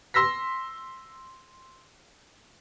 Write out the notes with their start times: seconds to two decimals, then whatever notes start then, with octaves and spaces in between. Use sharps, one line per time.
0.14 C6 E6 A#6 B6